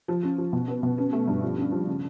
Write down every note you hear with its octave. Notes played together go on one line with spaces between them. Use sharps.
F3
C#4
F3
B2
B3
B2
C#4
A3
G2
F3
C#4
F3
C#3